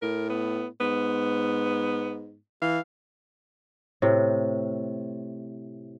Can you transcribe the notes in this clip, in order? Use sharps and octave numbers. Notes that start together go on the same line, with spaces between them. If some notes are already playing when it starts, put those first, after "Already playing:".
A2 A#4
B3
G#2 B3
E3 F5
A2 C3